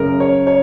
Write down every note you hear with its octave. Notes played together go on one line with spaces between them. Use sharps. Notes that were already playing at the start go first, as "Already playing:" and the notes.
Already playing: F#1 F#2 C#3 A#4
C#5
C#5